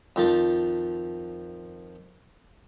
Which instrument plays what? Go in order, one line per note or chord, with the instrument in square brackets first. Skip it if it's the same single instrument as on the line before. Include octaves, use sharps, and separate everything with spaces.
[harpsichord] F2 D#3 F3 A5